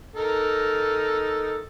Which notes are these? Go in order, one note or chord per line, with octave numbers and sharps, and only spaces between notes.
D#4 A4 A#4